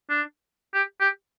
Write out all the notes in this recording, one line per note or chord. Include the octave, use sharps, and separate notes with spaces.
D4
G4
G4